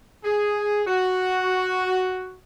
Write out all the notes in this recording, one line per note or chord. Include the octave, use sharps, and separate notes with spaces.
G#4
F#4